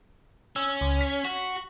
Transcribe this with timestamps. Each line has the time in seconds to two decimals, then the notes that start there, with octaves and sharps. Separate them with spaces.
0.56 C#4 E6
0.81 C#2
1.01 B6
1.25 F#4